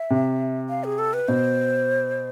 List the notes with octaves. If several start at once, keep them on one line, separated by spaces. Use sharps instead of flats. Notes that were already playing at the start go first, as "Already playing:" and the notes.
Already playing: E5
C3
F5
G#4
A4
B4
B2 C5